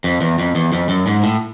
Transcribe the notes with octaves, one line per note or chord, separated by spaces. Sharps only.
F2
E2
F2
E2
F2
F#2
G#2
A2